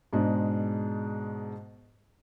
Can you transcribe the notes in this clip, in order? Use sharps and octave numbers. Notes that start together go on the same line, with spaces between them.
G#2 B2 G#3 D4